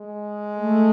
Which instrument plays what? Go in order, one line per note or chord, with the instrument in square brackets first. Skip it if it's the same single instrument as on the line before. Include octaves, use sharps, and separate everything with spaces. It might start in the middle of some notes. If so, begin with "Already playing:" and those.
Already playing: [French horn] G#3
[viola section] A3